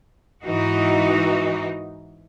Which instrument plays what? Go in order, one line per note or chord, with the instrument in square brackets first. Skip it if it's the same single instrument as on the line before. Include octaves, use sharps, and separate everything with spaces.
[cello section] G#2 E3 D#4 F#4